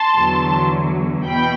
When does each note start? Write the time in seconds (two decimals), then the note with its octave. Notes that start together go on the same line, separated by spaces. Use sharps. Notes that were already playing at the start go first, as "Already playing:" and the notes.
Already playing: A5 C6
0.16 E2 D3 F#3
1.25 E2 B2 G5 B5